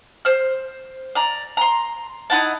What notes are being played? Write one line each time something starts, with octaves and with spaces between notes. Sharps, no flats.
C5 F6
D5 A#5
A#5 C6
D#4 E4 F#5 A5